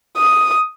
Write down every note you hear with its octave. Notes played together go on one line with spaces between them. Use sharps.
D#6